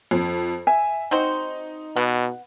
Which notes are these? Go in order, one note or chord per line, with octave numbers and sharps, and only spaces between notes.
F2
E5 G#5
C4 D#4 F#4 C5
B2 B3